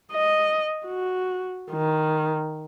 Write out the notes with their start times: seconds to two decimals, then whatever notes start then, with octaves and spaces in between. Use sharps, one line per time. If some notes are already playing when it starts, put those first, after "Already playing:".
0.12 D#5
0.86 F#4
1.71 D#3